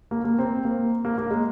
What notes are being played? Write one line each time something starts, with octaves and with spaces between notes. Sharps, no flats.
A#3
A#3
C4
A#3
A#3
A#3
G#3